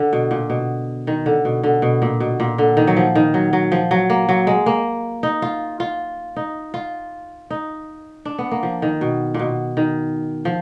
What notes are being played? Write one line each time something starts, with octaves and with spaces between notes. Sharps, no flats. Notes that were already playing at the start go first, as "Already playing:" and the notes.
Already playing: D3
B2
A#2
B2
D#3
D3
B2
D3
B2
A#2
B2
A#2
D3
D#3
F#3
F3
D#3
F#3
F#3
F3
F#3
A#3
F#3
G#3
A#3
D#4
F4
F4
D#4
F4
D#4
D4
B3
A#3
F3
D#3
B2
A#2
B2
D#3
F3